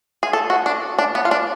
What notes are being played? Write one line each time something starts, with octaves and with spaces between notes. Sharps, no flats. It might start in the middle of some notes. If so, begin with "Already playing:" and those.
G#4
A4
F#4
D4
D4
B3
F4
D4